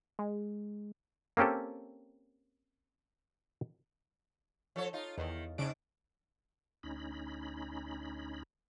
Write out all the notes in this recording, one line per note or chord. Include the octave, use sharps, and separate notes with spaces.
G#3
A#3 C4 C#4 G4 A4
F3 A4 C#5
D#4 F4
E2 D#3
G#2 C#3 D4 D7
D2 C#4 D#4 B5